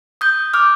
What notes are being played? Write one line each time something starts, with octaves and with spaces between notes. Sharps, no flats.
D#6 G6
D6 F6